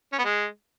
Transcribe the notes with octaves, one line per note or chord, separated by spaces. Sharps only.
C#4
B3
G#3